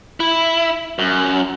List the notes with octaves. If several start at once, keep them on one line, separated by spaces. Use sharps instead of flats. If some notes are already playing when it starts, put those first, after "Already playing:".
E4
F#2